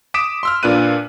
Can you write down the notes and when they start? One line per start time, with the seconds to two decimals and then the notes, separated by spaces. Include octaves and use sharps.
0.14 D6 D#6 B6 D7 E7
0.43 C6 E6 F6
0.63 A#2 D4 F4 B4 F#6 D#7